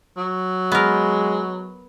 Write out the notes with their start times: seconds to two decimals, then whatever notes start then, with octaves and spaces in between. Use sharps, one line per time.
0.17 F#3
0.72 G#3 B3 A#4